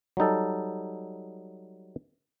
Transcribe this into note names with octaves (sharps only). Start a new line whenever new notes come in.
F#3 G3 D#4 A4